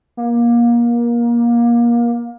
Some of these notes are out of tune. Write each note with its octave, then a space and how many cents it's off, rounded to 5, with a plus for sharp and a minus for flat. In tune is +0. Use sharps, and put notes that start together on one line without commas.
A#3 +25